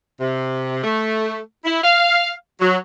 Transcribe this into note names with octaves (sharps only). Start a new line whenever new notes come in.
C3
A3
E4
F5
F#3